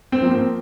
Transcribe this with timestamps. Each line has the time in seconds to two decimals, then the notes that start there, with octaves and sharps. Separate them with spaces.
0.12 C4
0.22 F3 A#3
0.31 C4